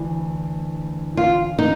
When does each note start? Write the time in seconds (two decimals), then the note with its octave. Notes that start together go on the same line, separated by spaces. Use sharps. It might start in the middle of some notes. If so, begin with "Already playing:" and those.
Already playing: D2 E3
1.17 F4
1.59 D#4